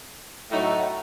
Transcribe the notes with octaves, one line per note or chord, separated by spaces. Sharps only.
A2 F#3 A3 D#4 F#4